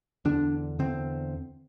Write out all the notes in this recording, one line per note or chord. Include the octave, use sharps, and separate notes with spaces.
E2 D3 D4
E2 D3 C4